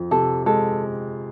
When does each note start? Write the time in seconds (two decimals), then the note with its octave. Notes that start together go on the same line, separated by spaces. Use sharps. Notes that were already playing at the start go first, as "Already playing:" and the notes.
Already playing: F2 F3
0.11 C3 A4
0.46 G#3 A4